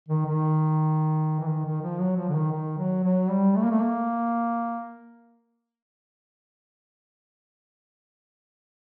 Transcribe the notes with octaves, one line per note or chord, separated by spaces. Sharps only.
D#3
D#3
E3
D#3
D#3
F3
F#3
F3
D3
D#3
D#3
F#3
F#3
G3
A3
A#3
A3
A#3